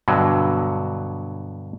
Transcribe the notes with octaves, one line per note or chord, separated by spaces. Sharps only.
G2 B2 D3 F#3